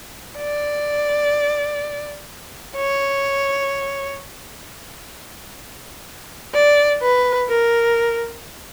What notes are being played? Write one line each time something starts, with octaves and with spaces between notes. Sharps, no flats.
D5
C#5
D5
B4
A#4